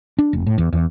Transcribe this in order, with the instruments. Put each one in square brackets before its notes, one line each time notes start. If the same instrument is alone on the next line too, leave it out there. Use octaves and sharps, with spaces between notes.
[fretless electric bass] D4
F1
A2
E2
E2